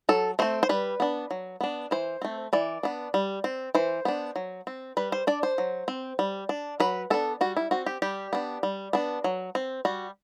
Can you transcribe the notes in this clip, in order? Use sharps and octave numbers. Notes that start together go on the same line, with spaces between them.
F#3 A4
A3 C4 C5
C5
G3 B4
B3 D4
F#3
B3 D4
E3 C5
A3 C4
E3 D5
B3 D4
G3
C4
E3 C5
B3 D4
F#3
C4
G3 B4
C5
D4 D5
C5
F#3
C4
G3
D4
F#3 B4
B3 D4 A4
G3 F#4
E4
C4 F#4
G4
G3 G4
B3 D4
G3
B3 D4
F#3
C4
G3 F#4